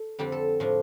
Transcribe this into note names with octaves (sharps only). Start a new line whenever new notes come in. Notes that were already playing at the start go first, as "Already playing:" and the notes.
Already playing: A4
F2 D3 G3 C4 G4
A4
A2 F3 D4